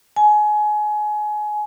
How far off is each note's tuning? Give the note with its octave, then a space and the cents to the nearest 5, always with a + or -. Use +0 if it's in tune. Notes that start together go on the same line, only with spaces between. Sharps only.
G#5 +25